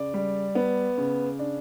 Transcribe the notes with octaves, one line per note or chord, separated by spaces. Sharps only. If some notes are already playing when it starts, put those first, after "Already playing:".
Already playing: C#3 D5
G3
B3
C#3
D4